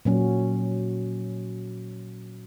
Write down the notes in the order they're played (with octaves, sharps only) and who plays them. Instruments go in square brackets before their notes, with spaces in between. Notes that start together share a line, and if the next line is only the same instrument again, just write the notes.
[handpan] A#2 F#3 C#4